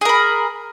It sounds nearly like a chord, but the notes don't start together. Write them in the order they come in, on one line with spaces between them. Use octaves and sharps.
G#4 A#4 B5